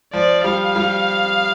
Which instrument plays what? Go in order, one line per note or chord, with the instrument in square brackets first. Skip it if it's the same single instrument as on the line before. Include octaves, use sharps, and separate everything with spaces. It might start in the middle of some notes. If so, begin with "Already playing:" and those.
[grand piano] F3 [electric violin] D5
[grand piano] G3 [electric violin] F5
[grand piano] G3